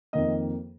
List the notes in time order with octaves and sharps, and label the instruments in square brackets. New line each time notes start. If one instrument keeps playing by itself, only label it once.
[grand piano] F2 D#3 A#3 D#5